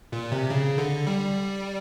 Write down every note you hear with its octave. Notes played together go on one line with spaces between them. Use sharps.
A#2
C3
C#3
D3
G3